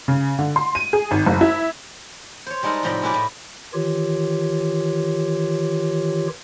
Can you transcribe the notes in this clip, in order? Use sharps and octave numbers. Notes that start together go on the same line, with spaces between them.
C#3
D3
C6
D#7
G#4
G#1
F#1
E4
C5 C#5
G3 G#3 D#4 A4 A#4 F#5
A2 C3 F3 D#4 A#5 B5
G#3 C#4 E4 G4 B4 D5
A2
D#3 E3 F4 G4 C#5